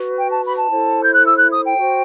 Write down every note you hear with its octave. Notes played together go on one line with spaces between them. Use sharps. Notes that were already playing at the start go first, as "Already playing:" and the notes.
Already playing: F#4 B4
G5
A5
B5
A5
E4 A4 C5
G6
F#6
E6
F#6
D#6
G5
F#4 C5